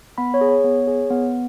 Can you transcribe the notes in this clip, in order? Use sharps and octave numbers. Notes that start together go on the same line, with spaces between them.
B3 B5
C#5
G#4
C#5
B3
G#4
B3